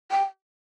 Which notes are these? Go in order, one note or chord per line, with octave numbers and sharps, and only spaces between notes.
G5